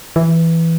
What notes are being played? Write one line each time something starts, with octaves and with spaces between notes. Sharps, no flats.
E3